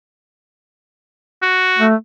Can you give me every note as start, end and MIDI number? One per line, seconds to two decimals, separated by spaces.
1.43 1.85 66
1.79 1.95 57